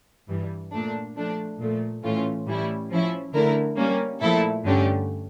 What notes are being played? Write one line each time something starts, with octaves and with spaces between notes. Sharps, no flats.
G2 E3 G3
A#2 A3 D4
F3 A3 D4
A#2 F3 A3
A2 E3 A3 C#4 F4
A2 E3 G3 C#4 E4
F3 C#4 E4
D3 A3 E4 A#4
G3 A#3 C#4
A#2 F3 A3 E4 A4
G2 D3 A3 C#4 G4